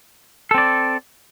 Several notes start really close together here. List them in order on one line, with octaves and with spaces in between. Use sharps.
A4 C4 D5